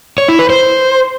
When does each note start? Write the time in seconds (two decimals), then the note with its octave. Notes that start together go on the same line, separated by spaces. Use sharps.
0.18 C#5
0.29 E4
0.39 B4
0.50 C5